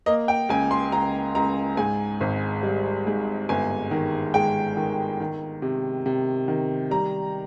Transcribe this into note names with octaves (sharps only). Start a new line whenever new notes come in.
A#3 D#5
G5
C#2 G#5
C6
C#2 A#5
C#2 A#5
G#2 G#5
G#1
G3
G#2
G1 G#5
D#3
G#3 G5
D#3
D#3
C3
C3
D#3
G3 A#5